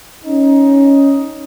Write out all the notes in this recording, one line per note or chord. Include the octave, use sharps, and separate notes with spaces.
C#4 D#4